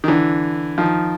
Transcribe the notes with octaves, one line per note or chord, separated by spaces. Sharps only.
D#3
D3 E3
D#3 F3